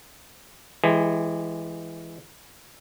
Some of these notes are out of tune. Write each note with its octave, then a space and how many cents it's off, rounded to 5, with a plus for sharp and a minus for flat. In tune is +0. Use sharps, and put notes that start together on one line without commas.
E3 +5 G#3 +5 G4 +40